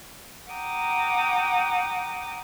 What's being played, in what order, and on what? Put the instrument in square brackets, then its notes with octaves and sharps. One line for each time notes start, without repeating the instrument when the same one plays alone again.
[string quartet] F#5 G5 A#5 D6 D#6